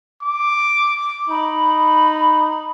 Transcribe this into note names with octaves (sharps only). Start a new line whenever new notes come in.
D6
D#4 B5